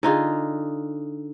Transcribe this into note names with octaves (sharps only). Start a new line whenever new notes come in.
D3 D#4 F4 G#4